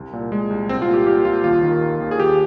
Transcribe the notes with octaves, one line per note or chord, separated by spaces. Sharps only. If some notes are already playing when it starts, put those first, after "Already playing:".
Already playing: C2
A#2
A#2 G#3
C2
C2 C4
F4
A#2
G4
A#2 G4
C2 F4
D#2 F4
D#3
D#3
D#2
G#4
D#2 G4